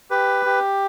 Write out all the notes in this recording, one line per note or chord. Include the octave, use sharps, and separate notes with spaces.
G4 B4
G4